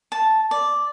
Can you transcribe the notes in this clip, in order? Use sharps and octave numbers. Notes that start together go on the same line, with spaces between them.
A5
D5